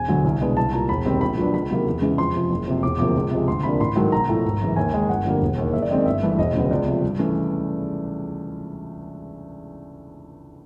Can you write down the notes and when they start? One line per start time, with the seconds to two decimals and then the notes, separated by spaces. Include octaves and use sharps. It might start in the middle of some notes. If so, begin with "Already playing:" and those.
Already playing: E1 G#5
0.08 D2 D3 F#3
0.24 C2
0.40 B2 G#3 B3 D4
0.57 C2 A5
0.73 A#2 G3 A#5
0.89 E1 B5
1.05 D#2 D#3 G3 C4
1.21 A#1 B5
1.37 A#2 F#3 B3 D4
1.53 C#2 B5
1.70 C3 D#3 F#3 A#3
1.86 E2
2.02 C#3 E3 G#3 C#4
2.18 F2 C6
2.35 C3 F3
2.50 F#1
2.67 F2 C3
2.83 E1 D6
2.99 D2 C3 F3 A#3 D6
3.16 C#2
3.31 C3 F3 G#3
3.48 D2 C6
3.63 C3 F3 A#3 D4 B5
3.80 A1 C6
3.96 G#2 D#3 F#3 A3
4.12 B1 A#5
4.29 A2 F3 A3
4.44 G#1
4.61 F#2 C#3 E3
4.76 D#2 G#5
4.94 D#3 G#3
5.09 G1 F#5
5.25 F2 D3 G3 A#3
5.42 E1
5.58 D#2 D#3
5.73 F#1 E5
5.82 D5
5.90 F#2 D#3 G#3 C4 D#5
5.98 D5
6.05 G1 E5
6.23 G2 E3 A3
6.38 E1 D#5
6.54 D2 C#3 F#3 B3
6.71 C#2 D5
6.87 C3 F3 A3
7.03 G2
7.19 E3 A3 C#4